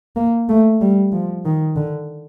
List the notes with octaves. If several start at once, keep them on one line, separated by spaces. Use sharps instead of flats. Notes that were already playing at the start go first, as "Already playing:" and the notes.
A#3
A3
G3
F3
D#3
D3